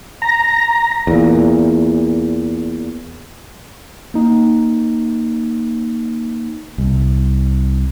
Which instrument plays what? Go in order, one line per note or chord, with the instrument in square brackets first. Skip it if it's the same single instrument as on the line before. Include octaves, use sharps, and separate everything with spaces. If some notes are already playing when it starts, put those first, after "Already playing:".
[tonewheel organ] A#5
[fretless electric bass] E2 A#2
[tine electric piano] A#3 D#4
[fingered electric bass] C2